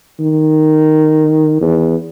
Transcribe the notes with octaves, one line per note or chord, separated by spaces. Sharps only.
D#3
E2